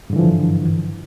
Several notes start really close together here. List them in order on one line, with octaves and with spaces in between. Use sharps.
G2 D3 E3 F3